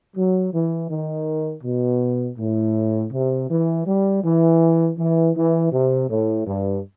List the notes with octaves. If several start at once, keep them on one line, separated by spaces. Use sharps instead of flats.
F#3
E3
D#3
B2
A2
C3
E3
G3
E3
E3
E3
C3
A2
G2